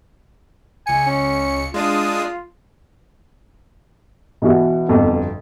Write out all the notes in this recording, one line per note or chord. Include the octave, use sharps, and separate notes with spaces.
C#2 G#5 C#7
C#4
G#3 D4 F4 D#6
B2 E3 F#4
G1 F2 B2